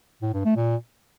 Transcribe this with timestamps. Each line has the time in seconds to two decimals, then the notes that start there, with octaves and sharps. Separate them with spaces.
0.22 A2
0.33 G2
0.45 A3
0.56 A#2